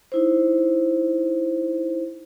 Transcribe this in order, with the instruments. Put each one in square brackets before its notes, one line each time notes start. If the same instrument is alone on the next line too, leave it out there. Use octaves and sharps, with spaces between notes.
[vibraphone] D#4 E4 C5